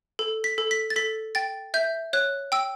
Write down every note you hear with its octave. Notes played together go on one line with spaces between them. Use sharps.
A4
B6
A4
B6
A6
A4 B6
G5 A6
E5 G6
C#5 F#6
G5 E6